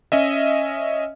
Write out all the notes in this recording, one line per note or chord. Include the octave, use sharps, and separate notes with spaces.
C#4 D#5 E5